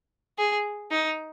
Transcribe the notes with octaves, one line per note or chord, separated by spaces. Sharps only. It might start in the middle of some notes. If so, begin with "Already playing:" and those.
G#4
D#4